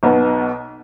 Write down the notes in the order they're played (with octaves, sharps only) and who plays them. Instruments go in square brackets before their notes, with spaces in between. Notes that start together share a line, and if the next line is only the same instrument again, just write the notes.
[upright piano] B1 B2 B3